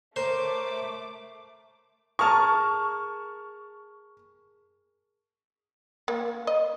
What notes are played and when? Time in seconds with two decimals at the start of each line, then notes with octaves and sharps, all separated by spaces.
0.16 A3 A#4 C5 C#5 D6
2.19 G#4 A#4 A5 C#6 F6
6.08 A#3
6.47 D#5